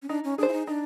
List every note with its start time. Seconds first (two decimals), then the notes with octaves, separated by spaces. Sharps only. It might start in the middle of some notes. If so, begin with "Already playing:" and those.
0.02 C#4
0.09 D4 D#4
0.24 C#4
0.38 D4 G#4 C5
0.48 E4
0.53 D#4
0.67 D4 D#4